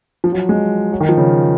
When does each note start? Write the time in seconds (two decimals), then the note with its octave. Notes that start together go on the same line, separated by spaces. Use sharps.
0.24 F3
0.32 F#3
0.49 G#3
0.92 F#3
1.00 D#3
1.09 F3
1.17 C#3